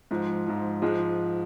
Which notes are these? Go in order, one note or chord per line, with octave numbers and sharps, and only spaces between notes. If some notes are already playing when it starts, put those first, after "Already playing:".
G#2 F3
G#2 F3
G#2 F3 G#3